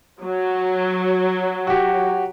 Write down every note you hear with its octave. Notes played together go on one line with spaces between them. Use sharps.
F#3
F#4 G4